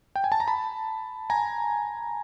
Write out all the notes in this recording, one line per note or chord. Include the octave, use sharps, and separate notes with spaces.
G5
G#5
A5
A#5
A5 B5
G#5 A#5